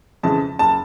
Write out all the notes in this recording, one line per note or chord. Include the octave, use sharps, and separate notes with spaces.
F2 C#3 E3 G#3 A5
F#1 A5